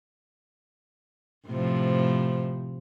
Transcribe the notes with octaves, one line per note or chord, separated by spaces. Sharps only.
A2 C3 F3